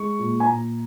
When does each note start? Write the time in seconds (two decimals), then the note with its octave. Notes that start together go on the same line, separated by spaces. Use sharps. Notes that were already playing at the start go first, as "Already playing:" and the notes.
Already playing: G#3 C#6
0.19 A#2
0.40 G#5
0.46 A#2 A#5